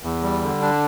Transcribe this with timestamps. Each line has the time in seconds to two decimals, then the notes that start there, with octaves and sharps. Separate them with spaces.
0.03 E2
0.23 G3
0.42 D3
0.62 D4